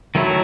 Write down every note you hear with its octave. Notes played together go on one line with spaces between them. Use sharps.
D#3 F#3 A3 E4